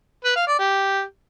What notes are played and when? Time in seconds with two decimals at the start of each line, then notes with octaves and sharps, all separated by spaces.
0.24 B4
0.36 F5
0.47 D5
0.59 G4